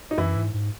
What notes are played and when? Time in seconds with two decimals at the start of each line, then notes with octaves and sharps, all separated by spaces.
0.11 D#4
0.18 F#2 E3 E4
0.36 G#2
0.54 G#2